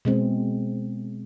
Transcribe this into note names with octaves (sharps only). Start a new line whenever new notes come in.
B2 G#3 C4